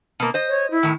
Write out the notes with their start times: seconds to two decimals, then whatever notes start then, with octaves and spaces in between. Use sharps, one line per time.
0.20 B2 A#3
0.34 C5 D#5
0.48 C#5
0.71 E4
0.83 A2 D#3